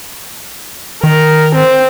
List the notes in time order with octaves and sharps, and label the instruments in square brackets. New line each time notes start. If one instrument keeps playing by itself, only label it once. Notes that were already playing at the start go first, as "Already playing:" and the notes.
[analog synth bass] D#3 [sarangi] A#4
[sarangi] C4